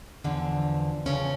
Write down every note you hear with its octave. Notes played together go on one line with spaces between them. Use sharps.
E2 D3 F3
E2 C#3 F3 C#4